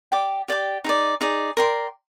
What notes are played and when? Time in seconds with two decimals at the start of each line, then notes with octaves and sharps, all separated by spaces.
0.12 G4 D5 G5 D6
0.48 G4 D5 G5 D6
0.84 D#4 G#4 D5
1.21 D#4 G#4 D5
1.57 A#4 D5 G5 C6